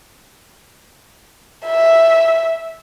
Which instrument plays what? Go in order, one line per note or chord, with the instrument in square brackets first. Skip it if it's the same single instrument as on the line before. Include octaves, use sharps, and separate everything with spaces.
[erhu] E5